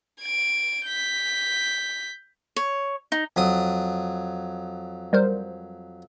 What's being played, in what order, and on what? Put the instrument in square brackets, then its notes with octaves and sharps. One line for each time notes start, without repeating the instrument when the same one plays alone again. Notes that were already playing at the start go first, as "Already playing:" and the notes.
[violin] G#6 D7
G6 B6
[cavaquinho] C#5
D#4
[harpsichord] F2 F#3 D#6
[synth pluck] G3 A#4 C5